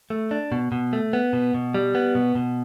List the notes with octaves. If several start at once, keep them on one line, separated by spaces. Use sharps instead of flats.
A3
D4
B2
B2
A3
B3
B2
B2
G3
B3
B2
B2